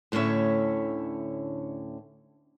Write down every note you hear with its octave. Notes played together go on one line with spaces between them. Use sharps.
D2 A2 D3 C#4 C#5 E5